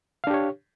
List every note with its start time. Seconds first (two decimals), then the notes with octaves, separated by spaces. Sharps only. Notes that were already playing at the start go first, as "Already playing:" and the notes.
0.24 F5
0.27 D4
0.30 G4
0.34 C#5